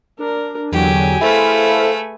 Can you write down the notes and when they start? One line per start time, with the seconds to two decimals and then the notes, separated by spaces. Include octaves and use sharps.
0.19 D4 A#4
0.72 E2 D3 F#3 G4 G#4 G#5
1.21 A3 E4 A4 B4 C5 F5